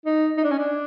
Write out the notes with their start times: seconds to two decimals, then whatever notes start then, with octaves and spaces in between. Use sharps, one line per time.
0.06 D#4
0.37 D#4
0.44 D4
0.51 C#4
0.59 D4